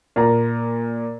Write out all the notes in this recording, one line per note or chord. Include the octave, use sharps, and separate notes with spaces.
A#2 A#5